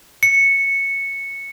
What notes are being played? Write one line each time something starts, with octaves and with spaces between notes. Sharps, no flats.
C#7